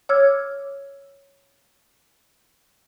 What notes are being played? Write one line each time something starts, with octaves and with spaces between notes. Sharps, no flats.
C#5 D6 E6 F6 G#6